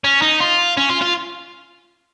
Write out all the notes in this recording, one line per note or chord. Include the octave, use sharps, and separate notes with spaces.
C#4
D#4
F4
C#4
F4
F4